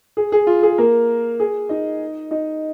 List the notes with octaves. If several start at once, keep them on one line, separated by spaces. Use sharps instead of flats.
G#4
G#4
F4
G#4
A#3 A#4
G#4
D#4 D#5
D#4 D#5